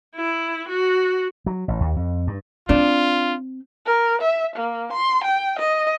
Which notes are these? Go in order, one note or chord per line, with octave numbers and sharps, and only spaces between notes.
E4
F#4
F#3
A1
D#2
F2
G2
C4 D4 F4
A#4
E5
A#3
C6
G5
D#5